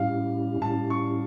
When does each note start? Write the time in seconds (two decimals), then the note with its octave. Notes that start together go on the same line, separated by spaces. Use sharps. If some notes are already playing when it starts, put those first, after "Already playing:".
Already playing: A2 G3 C#4 E4 G4 F5
0.61 A2 G3 C#4 E4 G4 A5
0.90 C#6